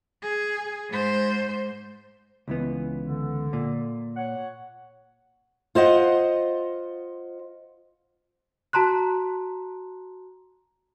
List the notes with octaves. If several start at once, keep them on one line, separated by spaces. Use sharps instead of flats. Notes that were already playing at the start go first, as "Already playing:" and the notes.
G#4
G#2 C5
C#2 E3 B3
D3
A#2
C#5 F#5
F4 C5 D#5 F#5
F#4 A5 A#5 C6 F#6